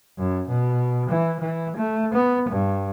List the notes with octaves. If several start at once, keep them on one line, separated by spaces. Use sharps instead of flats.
F#2
B2
E3
E3
A3
B3
G2